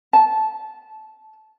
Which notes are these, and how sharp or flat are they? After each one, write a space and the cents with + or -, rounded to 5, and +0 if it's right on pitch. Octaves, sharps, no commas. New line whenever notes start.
A5 -15